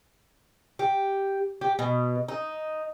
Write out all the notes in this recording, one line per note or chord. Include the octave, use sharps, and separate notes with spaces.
G4
G4
B2
D#4